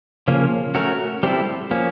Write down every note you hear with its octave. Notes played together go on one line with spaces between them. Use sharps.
C#3 F3 A#3 C#4
A3 C#4 F#4 A#4
G3 C4 E4 A4
F3 A#3 C#4